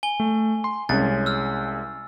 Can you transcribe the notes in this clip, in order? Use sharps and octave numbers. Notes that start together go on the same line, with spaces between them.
G#5 G7
A3
C6
C2 G#3 C#4 A6
E6 F6